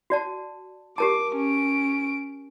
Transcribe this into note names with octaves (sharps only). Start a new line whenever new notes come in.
F#4 D5 A5
G4 A#4 A5 D6
C#4 D7